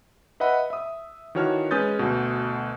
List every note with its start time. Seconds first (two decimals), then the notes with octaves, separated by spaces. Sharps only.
0.40 B4 D#5 E5 F#5 B5
0.70 E5 D#6
1.35 D#3 E3 F#4 C#5 A5 F6
1.71 G#3 C#4 B4 D#6 G6 A6
1.99 D2 B2